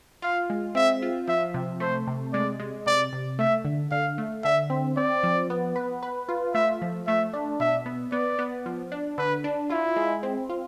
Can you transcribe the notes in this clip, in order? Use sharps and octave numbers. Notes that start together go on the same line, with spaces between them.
F4 F5
G#3
C4 E5
F4
F3 E5
C3
A3 C5
C3
G#3 D5
G#3
C3 D5
C3
A3 E5
D3
D3 F5
A3
D3 E5
C4
C4 D5
F3
B3
B4
B4
F4
A3 E5
F3
A3 E5
D4
B2 E5
B3
B3 D5
B3
F3
D4
D3 B4
D4
E4 F4
G#3
C4
F4